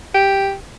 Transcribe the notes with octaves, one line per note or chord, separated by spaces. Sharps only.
G4